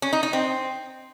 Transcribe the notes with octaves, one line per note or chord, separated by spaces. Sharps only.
C#4
D#4
D#4
C4